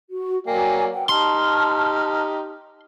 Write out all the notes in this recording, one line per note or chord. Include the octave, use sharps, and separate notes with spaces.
F#4
F#3 A#3 D5 G5 G#5
B4 F#5 G5
D#4 G4 A5 C6 F6